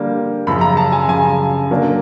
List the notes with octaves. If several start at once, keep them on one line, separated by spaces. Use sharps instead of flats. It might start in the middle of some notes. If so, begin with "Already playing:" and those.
Already playing: D3 G3 A#3
F#2 C#3 F3 B5
A#5
A5
G#5
F#2 C#3 F3 G#5
D3 F#3 A#3 D4